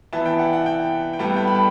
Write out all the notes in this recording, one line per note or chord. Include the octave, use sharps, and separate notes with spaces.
E3 B3 E4 A5
G5
F#5
F#5
G5
G5
A2 G3 B3 A5
G5
B5
A5